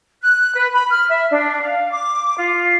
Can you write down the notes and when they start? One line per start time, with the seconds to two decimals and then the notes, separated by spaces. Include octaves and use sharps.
0.21 F#6
0.54 B4
0.72 B5
0.89 F6
1.09 E5
1.30 D4
1.61 F5
1.90 D6
2.37 F4